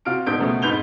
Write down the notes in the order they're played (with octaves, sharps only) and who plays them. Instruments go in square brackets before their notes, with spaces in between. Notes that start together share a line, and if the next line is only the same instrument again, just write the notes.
[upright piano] C3 F4 F#4 F6 D7
D#1 G#2 B3 D4 G6 D7
C#2 B2 F3 A3 B3
F2 G#2 B4 G6 F7 G7